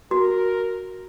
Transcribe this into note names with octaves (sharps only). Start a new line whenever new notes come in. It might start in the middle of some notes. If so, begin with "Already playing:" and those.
F#4 A#4